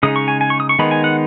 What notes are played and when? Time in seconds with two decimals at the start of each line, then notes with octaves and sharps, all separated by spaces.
0.03 C#3 G#3 D#4 D#6
0.16 C#6
0.28 G#5
0.41 G#5
0.50 C#6
0.60 D#6
0.69 C#6
0.79 D#3 G#3 B3 D#4 B5
0.91 G#5
1.04 F#5